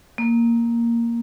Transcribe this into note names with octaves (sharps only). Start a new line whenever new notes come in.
A#3